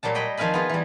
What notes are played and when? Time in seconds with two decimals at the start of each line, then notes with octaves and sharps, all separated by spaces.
0.03 A#2 F#3 G3 A5
0.15 C#5 D#5 G5 B5
0.37 D#3 F3 C4 F5 G#5 B5
0.54 B3 D#4 F4 G#4
0.69 E3 G3